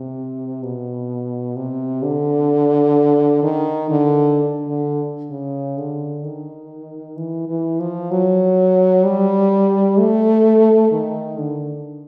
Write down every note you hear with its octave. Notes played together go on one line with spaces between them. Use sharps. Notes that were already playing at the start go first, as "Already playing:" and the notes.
Already playing: C3
B2
C3
D3
D#3
D3
D3
C#3
D3
D#3
E3
E3
F3
F#3
G3
A3
D#3
D3